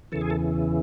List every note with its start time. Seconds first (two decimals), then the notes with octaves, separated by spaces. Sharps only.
0.12 E2 C#3 E3 A4
0.21 G#4
0.30 A4